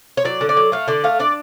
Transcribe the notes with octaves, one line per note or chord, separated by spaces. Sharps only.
C#5
F#3 D5
D3
D5
F#3
A3 F5
D3 D5
A3 F5
D4 D5